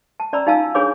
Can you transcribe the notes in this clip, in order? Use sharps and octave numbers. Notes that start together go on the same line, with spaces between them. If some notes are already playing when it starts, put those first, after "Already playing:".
A5
C#4 D5 A#5 B5 E6
D#4 F4 F5 G#5 A5 E6
D4 G#4 C#5 B5 D6